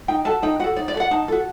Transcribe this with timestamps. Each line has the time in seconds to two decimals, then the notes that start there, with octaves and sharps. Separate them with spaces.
0.08 D#4 G5
0.25 F#4 A4 A5
0.43 D#4 G5
0.60 F#4 A4 F#5
0.76 D#4 D5
0.88 D5
0.94 F#4 A4
1.00 F#5
1.11 D#4 A5
1.28 F#4 A4